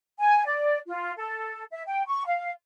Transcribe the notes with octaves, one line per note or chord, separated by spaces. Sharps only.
G#5
D5
F4
A4
E5
G5
C#6
F5